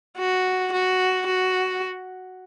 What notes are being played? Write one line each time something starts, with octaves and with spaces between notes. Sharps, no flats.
F#4
F#4
F#4